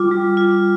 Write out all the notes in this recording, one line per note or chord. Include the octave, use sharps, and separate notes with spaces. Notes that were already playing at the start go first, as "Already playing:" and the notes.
Already playing: G3 F4 D6
G3
F4